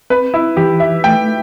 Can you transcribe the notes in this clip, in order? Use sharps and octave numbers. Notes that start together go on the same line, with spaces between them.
C4 B4
E4
E3 G4
E5
A3 G5